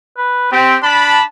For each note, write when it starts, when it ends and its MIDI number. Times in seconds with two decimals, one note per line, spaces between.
0.18 0.51 71
0.52 0.77 60
0.52 0.77 67
0.83 1.19 62
0.83 1.23 81
0.83 1.23 83